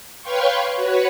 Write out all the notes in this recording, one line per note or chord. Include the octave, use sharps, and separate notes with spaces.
B4 C#5 F5 G5 C6 C#6
F#4 B4 C#5